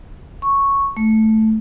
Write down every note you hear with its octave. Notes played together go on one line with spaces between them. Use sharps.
C#6
A3